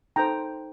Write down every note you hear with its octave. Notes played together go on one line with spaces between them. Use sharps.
D#4 A4 C5 G5 A#5